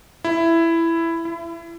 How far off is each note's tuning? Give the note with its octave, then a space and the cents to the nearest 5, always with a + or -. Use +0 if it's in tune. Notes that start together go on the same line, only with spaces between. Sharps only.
E4 +10
E4 +30